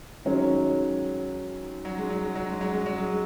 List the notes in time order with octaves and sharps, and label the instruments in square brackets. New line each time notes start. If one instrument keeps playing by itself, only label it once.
[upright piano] D#3 F#3 C#4 [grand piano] G#3
[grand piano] F#3
G#3
F#3
G#3
F#3
G#3
F#3
G#3
F#3
G#3